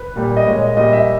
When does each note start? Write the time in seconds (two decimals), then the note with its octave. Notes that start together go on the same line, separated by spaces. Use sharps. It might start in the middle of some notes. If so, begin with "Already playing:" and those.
Already playing: B4
0.16 A#2 G3
0.37 D#5
0.46 A#2 G#3 C#5
0.62 D#5
0.77 A#2 G3 D#5
0.93 E5